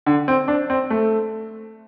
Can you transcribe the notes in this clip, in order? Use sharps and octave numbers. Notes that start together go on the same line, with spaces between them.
D3
C4
D4
C4
A3